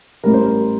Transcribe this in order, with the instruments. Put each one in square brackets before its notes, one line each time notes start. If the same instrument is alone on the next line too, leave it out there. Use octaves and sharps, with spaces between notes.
[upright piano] A1 A2 G3 A#4
C5
A#4